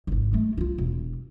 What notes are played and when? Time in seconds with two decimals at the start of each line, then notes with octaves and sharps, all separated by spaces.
0.07 D1 G#1
0.33 G#3 A3
0.57 E4 F4
0.78 E1